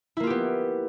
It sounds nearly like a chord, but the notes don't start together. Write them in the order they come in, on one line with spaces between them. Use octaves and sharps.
E4 A#3 F4 G4 B3